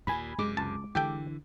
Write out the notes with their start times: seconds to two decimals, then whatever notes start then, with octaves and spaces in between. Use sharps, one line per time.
0.07 D#2 A#2 G#5 B5
0.38 F#2 C3 G#3 D6
0.57 C#2 A5
0.95 D3 E3 G4 A4 G5